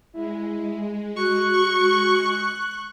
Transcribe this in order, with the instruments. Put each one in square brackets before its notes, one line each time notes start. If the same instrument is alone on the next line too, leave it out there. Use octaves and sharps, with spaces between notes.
[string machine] G#3 [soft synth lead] E4
[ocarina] F#4 [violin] C#6 [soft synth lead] F#6